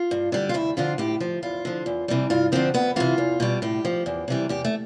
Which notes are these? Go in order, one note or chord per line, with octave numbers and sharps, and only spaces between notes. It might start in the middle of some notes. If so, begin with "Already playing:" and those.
Already playing: F4
G2
D3 G3
F4
D2 E4
D3 F3 F4
A2 G4
F3
E2 F4
D3 F3
E2
C3 E3 G3
G2 F4
D3 F3 C4
D2 B3
C3 E3 F4
E2
B2 G3
A2 G4
F3
E2
C3 E3 G3
E2 G4
A3